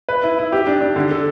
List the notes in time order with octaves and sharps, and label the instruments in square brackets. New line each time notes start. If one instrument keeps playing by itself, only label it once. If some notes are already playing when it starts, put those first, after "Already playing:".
[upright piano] B4
E4
E4
G4
D4
D4
D3
A4